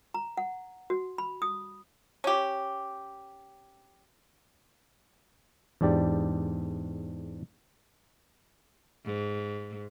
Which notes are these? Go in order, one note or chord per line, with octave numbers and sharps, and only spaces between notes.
A#5
F#5
F#4
B5
D#6
C#4 G4
E2 G#2 D4 G4 D5
G#2